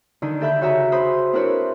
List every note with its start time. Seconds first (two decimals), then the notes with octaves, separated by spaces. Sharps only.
0.22 D3 D#3 D#4
0.40 G4 A4 E5 B5 G6
0.61 C#3 F#4 G#4 E5 A#5
0.92 C5 B5 D#6
1.33 C4 D4 E4 A#4 B4 C#5